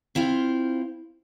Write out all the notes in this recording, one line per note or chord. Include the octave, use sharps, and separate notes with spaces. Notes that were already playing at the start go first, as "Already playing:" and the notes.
C4 E4 F4 C5 F5